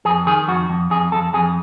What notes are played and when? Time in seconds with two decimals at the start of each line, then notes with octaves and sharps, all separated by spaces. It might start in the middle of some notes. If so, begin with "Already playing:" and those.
0.05 F2 G#4
0.27 D#3 G#4
0.48 F2 F#4
0.70 F2
0.91 F2 G#4
1.12 F2 A4
1.33 F2 G#4